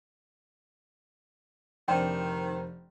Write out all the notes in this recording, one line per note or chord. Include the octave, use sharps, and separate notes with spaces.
F1 D#3 C4 D4 C5 G5